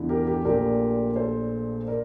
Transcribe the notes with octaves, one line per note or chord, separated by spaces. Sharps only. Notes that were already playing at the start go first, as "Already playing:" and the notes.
Already playing: E2 D3 A3 E4
G4 A#4
G4
A#1 A#2 A3 G4 A#4
A4 C5
A#4 D5